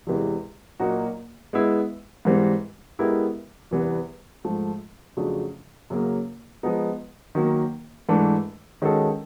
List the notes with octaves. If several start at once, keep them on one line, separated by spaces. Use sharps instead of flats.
E2 C3 E3 G#3
A#2 F#3 A#3 D#4 F#4
G#3 B3 E4
G#2 E3 G3 C4
G#3 B3 E4 G4 A#4
E2 C3 E3 G3 B3
G#2 F3 A3
F2 C#3 F#3 A3 D4
F#2 C#3 F#3 A#3
F3 G#3 B3 D#4
D#3 F#3 A#3
G#2 E3 A3 D4
D#3 G#3 C#4 F#4 A4